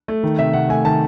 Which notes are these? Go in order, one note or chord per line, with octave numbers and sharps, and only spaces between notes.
A3
D#3
C3 E5
C3 F#5
A3 G#5
D#3 A5